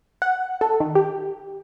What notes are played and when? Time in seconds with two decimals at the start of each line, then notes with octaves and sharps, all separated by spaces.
0.22 F#5
0.61 A4
0.80 D#3
0.95 G4